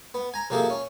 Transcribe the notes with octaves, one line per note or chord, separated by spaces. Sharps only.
B3
G#5 A#5
C3 F3 A#3 G#4 A4
C#4